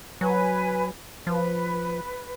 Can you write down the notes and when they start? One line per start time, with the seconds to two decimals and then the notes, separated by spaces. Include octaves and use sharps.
0.21 F#3 B4 G#5
1.27 F3 B4